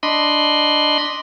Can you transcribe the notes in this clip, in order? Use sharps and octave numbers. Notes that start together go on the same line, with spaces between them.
D4 D#5 B5 C6